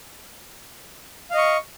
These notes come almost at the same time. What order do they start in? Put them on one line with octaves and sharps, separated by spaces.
F5 D#5 C#6